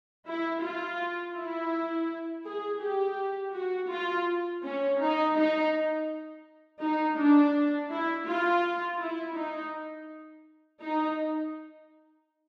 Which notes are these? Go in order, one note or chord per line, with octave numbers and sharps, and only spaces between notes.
E4
F4
E4
G#4
G4
F#4
F4
C#4
D#4
D#4
D#4
D4
E4
F4
E4
D#4
D#4